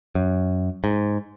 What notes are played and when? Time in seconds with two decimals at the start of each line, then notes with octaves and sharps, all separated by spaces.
0.15 F#2
0.84 G#2